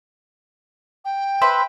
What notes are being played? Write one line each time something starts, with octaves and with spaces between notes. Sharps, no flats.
G5
B4 C5 E5